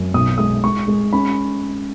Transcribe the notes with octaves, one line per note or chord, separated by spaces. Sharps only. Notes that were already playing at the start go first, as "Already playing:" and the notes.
Already playing: F#2
B1 D#6
G#3 D#6
G#3 C#6
G#3
C#4 B5